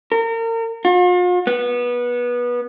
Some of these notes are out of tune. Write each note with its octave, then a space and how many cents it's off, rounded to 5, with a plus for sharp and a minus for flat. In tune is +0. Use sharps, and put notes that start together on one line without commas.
A#4 -35
F4 +45
B3 -20